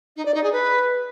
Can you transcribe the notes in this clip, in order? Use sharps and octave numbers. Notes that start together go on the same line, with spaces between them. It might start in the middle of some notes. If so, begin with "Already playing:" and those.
D#4
D5
D#4
G#4
B4